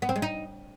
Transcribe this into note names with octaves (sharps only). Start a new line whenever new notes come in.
B3
C4
G#3
D#4